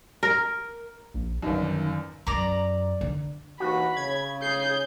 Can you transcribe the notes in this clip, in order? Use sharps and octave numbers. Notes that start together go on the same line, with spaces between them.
A#4
A#1
G1 F#2 D#3
F#2 D5 A#5
D3
D#2 E3 F#4 B5
C#3 G#6
G#4 G6 C7